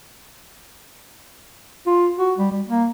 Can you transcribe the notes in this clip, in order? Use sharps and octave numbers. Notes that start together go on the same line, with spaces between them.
F4
F#4
G3
G3
A#3